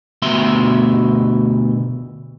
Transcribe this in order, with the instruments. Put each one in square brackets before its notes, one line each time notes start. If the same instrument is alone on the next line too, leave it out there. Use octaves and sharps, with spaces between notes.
[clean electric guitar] D2 B2 E5 C6